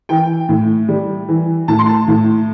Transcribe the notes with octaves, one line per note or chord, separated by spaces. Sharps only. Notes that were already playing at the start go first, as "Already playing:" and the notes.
E3 G5
A2
G3
E3
A2 A5
C6
A5
A2